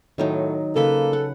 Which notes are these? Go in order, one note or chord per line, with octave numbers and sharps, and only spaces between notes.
A2 D#3 F#3 D#4
C#3 A#3 A4 B4 B5
F#5